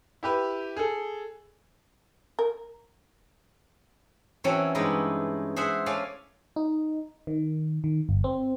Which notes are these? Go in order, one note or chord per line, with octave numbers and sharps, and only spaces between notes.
E4 G4 B4
G#4 A4
A#4
E3 F#3 C4 C#4 A4 C#5
G2 E3 G#3 B3 D#4 E4
G#4 C5 E5 F#5
A3 C#4 D5 F5 G#5
D#4
D#3
D#3
G1
C4